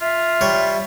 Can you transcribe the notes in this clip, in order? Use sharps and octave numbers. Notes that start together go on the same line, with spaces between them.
F4 E5
G3 C#5